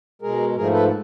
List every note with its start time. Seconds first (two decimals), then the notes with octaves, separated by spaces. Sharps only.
0.22 B2 G#3 G#4 A#4
0.56 G#2 F3 A3 G#4 A#4
0.72 A4 B4